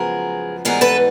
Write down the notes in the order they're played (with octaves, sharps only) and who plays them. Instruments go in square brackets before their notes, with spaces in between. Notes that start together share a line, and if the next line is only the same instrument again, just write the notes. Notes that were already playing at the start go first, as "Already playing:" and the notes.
Already playing: [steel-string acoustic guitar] F#2 C#3 F3 G#3 B3 G#4 A#4
G#2 E3 G3 B3 G#4 A#4
A4 B4